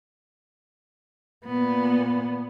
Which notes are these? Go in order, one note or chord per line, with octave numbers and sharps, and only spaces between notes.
A#2 B3